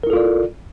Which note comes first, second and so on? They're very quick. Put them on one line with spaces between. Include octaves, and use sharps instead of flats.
A#4 E4 A4 F4 D5